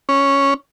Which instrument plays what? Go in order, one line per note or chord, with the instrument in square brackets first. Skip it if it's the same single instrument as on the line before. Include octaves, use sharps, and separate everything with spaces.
[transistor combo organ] C#4